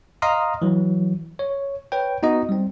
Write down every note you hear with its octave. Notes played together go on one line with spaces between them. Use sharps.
D#5 F5 A#5 C6 D#6 F6
E3 F#3
C#5
B4 C#5 G5
B3 D#4 F#4 D#5
G3 C4